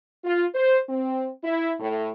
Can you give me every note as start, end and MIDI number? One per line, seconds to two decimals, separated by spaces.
0.25 0.44 65
0.55 0.79 72
0.89 1.27 60
1.43 1.73 64
1.80 2.11 45